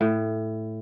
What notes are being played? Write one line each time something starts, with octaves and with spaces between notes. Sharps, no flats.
A2